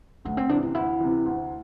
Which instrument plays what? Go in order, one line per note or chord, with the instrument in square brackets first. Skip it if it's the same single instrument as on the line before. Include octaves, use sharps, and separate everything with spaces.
[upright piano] D2 [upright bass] A3
[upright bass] C4
[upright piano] C3 E3 [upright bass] D4
[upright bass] D4
[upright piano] D2 [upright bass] E4
[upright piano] C3 E3
D2